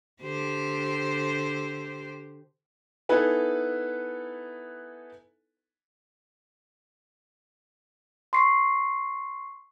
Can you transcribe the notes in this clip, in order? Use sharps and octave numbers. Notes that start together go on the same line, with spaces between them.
D3 G4 C5
B3 D#4 E4 A4 B4 G#5
C6 C#6 C7